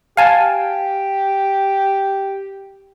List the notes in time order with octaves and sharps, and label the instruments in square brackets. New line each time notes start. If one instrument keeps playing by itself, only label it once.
[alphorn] G4 [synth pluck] F5 G#5 A5